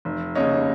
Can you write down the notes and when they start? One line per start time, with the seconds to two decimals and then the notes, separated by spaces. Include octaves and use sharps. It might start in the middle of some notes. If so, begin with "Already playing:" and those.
0.05 F1
0.35 D#2 C#3 C#5 D#5